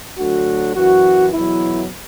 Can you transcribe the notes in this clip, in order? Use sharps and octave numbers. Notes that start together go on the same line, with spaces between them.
D2 D3 F#3 F#4
F#2 E3 F#4
E2 B2 F#3 E4